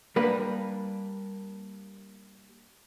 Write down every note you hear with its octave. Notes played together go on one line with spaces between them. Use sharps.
G3 A#3 D4 B4